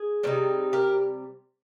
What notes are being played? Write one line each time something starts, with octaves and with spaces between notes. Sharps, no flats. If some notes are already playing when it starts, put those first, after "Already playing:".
Already playing: G#4
C3 G3 C4 D#4
G4 A#4